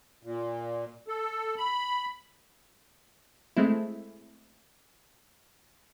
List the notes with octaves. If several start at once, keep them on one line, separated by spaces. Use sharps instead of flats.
A#2
A4
B5
G#3 A3 C4 E4